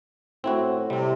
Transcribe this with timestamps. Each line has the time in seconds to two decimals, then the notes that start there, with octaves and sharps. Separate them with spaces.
0.44 A2 C4 E4 F#4
0.90 C3 G3 C4